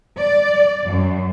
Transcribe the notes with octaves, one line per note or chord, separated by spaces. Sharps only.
D5
F#2